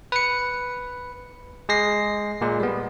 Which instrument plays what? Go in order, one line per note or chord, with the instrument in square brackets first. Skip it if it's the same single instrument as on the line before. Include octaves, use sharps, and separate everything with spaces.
[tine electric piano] B4 C#7
G#3 G#4 A#6 C7
A#2 G#3
G3 B3